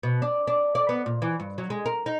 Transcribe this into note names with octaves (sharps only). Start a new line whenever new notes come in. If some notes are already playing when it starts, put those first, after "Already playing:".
B2
D4
D4
D5
B3
A#2
E3
G2
F#3
G#3
A#4
D#4